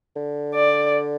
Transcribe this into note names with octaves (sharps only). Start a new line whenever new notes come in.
D3
D5